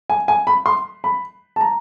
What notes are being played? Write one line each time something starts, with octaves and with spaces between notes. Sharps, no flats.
G#5
G#5
B5
C6
B5
A5
A#5